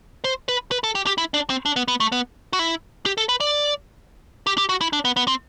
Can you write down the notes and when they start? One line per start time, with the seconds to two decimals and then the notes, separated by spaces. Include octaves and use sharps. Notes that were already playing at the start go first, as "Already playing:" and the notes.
0.24 C5
0.48 B4
0.71 B4
0.84 A4
0.95 G4
1.06 G4
1.18 E4
1.34 D4
1.50 C4
1.66 D4
1.76 B3
1.88 B3
2.00 A3
2.12 B3
2.53 F#4
2.59 E4
3.06 G4
3.18 A4
3.29 B4
3.40 D5
4.47 G4
4.58 G4
4.69 F#4
4.81 E4
4.93 D4
5.05 B3
5.16 B3
5.28 C4